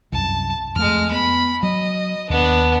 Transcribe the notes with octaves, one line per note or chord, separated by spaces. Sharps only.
C2 F#2 A5
F2 G#3 A3 F6
B3 B5
F#3 D#5
D#2 B3 D4